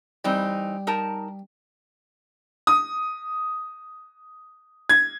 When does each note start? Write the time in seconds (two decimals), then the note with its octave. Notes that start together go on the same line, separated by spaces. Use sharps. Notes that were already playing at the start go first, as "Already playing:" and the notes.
0.25 E3 G3 C4 D#4
0.87 D#4 A#4 A5
2.67 D#6
4.89 G#6